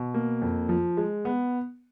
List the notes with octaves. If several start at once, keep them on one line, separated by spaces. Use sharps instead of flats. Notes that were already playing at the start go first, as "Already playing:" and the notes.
Already playing: B2
A#3
F2
F3
G#3
B3